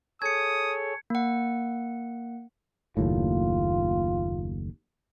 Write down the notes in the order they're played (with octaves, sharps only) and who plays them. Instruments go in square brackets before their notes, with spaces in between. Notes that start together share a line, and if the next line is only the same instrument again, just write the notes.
[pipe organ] G#4 A4 C#5 [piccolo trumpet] D#6 [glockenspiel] G#6 C#7
[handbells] A#3 F#5
[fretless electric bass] F#1 D#2 A2 [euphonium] F4